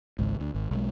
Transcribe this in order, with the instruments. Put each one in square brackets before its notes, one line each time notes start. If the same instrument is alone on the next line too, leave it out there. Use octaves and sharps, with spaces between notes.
[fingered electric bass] G#1 C#2 G#2
D2
G#1
B1 G#3